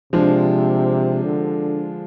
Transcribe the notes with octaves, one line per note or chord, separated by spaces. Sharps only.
C3 F3 G#3 D4
D3